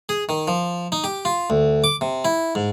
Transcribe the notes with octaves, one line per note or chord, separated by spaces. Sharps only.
G#4
D#3
F3
D#4
G4
F4
D2
D6
C3
E4
G#2